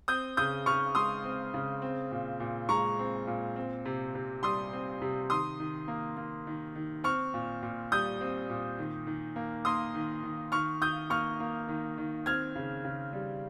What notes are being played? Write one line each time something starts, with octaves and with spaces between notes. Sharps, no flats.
C4 D#6 G6
C#3 D#6 G6
C#3 C#6 F6
G#3 C6 D#6
C4
C#3
C4
A#2
A#2
G#3 A#5 C#6
C4
A#2
C4
C3
C3
G3 C6 D#6
C4
C3
D#3 C6 D#6
D#3
A#3
A#3
D#3
D#3
C4 C#6 F6
A#2
A#2
G3 D#6 G6
C4
A#2
D#3
D#3
A#3
A#3 C6 D#6
D#3
D#3
D#3 C#6 F6
D#3 D#6 G6
A#3 C#6 F6
A#3
D#3
D#3
C4 F6 G#6
C#3
C#3
G3